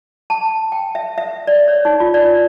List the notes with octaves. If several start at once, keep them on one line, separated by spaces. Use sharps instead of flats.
A5
G5
E5
E5
D5
C#5
D#4
F4
D5